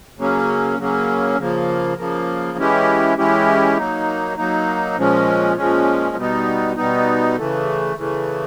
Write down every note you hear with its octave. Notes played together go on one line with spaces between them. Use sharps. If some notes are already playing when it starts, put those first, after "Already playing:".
C#3 F#3 A#3 C#4
C#3 F#3 A#3 C#4
C#3 F3 A#3
C#3 F3 A#3
E3 G#3 C#4 E4 G4
E3 G#3 C#4 E4 G4
F#3 A#3 D#4
F#3 A#3 D#4
A#2 F3 G#3 C#4
A#2 F3 G#3 C#4
B2 G3 B3 D#4
B2 G3 B3 D#4
C#3 E3 A3
C#3 E3 A3